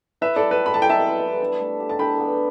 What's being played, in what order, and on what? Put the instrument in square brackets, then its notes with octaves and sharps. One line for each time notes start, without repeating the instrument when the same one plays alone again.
[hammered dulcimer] E4 [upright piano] B4 E5
[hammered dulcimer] G3 [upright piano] A4 D5
[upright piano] B4
[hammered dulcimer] A4 [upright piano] B5
[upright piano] A5
[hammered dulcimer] G4 [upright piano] G5
[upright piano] E5 A5
[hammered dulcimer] B3
E3
D4
A3
G4
[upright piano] A5
[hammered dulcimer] D4 [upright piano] G5 B5
[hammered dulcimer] B3